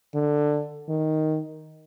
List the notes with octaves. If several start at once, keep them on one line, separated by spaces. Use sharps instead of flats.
D3
D#3